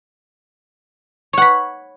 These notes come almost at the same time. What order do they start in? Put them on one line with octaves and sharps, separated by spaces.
C#5 F#5 B5